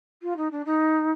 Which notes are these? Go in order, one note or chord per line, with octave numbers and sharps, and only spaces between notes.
F4
D#4
D4
D#4